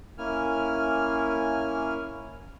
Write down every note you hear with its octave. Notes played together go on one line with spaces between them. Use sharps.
A#3 C#4 E4 G#5 F6